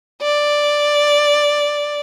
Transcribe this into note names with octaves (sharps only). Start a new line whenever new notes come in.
D5